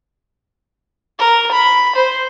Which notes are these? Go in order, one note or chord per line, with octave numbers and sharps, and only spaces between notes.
A#4
B5
C5